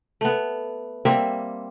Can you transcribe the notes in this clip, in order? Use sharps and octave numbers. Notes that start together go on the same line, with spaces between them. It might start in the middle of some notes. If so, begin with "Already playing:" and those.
A3 B3
G3 A#3 C4 E5